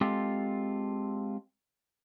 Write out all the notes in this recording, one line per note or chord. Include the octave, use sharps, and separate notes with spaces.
G#3 C4 F4 G4 A4